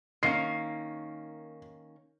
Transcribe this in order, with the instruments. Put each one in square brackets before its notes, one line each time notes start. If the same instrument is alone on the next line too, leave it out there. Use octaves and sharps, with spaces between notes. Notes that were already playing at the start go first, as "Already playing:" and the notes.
[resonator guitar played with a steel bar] D#3 A#3 C#4 [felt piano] C7